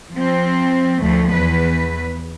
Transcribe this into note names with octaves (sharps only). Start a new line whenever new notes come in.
F3 C4
D2 F3 A3
E2 B4